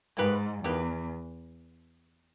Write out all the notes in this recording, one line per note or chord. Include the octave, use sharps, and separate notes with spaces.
G#2 A#3 D#4 G4 B4
E2 A#3 D#4 G4 B4